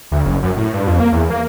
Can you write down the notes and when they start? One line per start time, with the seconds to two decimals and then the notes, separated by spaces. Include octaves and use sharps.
0.12 D2
0.25 F#1
0.43 F#2
0.57 A2
0.73 G2
0.87 F2
1.00 A#3
1.13 E2
1.30 A#3